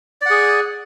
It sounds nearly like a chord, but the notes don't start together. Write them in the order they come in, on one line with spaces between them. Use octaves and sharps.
D5 F#5 G#4